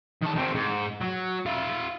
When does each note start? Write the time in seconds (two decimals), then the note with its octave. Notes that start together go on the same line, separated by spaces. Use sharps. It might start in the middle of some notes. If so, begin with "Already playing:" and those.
0.22 D#3 A5
0.35 D#3 C4
0.54 G#2
1.02 F#3
1.46 F4 E5